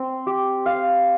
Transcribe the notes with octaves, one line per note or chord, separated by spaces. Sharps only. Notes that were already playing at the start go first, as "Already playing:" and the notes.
Already playing: C4
G4
F5